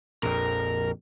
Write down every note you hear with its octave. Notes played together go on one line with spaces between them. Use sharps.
A#1 F2 A#4